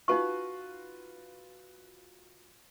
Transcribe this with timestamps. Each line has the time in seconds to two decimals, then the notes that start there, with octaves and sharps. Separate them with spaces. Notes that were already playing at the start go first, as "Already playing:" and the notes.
0.08 D#4 F4 F#4 B4 C#6